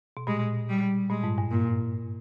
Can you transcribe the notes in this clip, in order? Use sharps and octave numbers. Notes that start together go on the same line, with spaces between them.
B2
A#2 G#3
G3
A#2 G#3
G#2
G2
A#2